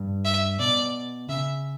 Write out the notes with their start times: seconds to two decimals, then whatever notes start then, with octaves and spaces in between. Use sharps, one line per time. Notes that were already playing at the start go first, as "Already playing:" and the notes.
Already playing: G2
0.25 E5
0.59 B2 D5
1.29 C#3 E5